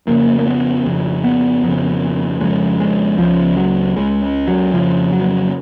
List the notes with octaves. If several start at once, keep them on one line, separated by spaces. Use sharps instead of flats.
F2 C#3 A#3
A#3
B3
F2 C#3
B3
F2 C#3
F2 C#3 G#3
G#3
C#2 C#3 F3
F#3
C#2 C#3 G#3
F#3
F2 C#3 F3
F#3